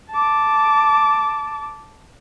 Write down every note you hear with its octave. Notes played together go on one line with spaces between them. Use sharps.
A5 D6